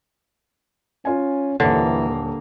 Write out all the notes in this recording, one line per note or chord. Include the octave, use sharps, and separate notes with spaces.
C#4 F4 G#5
D#1 D3 E3 A#3 C#5